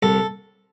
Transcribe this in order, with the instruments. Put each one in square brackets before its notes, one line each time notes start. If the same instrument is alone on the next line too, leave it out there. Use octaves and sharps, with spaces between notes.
[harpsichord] C2 A4